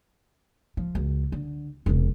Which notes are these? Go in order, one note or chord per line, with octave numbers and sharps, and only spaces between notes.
F3
C#2 F#2
D3
E1 C3